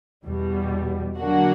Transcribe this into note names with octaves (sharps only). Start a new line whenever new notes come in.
E2 B2 G3
D3 F#3 A#3 D4 F#4